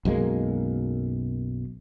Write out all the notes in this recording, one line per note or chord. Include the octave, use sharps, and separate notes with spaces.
B1 F#2 G#3 A#3